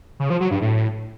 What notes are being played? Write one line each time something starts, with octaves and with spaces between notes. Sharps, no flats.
C#3
F3
F#3
G2
A2